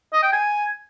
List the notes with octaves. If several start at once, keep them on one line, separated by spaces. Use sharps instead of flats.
D#5
G5
G#5